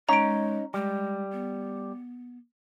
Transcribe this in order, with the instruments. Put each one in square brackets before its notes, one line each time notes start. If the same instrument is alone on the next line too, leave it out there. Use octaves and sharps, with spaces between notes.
[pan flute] G#3 [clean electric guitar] C#4 D#4 C#5 [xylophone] A#5 D7
[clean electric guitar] G3 [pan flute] G#3
[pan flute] B3